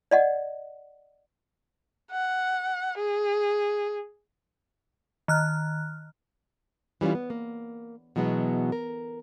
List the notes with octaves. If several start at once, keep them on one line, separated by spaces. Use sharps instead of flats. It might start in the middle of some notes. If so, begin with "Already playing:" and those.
D5 D#5 F#5
F#5
G#4
D#3 F6 F#6
E3 G3 B3 C#4 F4
B3
A#3
B2 E3 F#3 G#3 B3
A#4